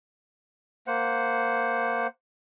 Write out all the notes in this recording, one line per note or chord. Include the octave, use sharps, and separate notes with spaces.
A#3 C5 F#5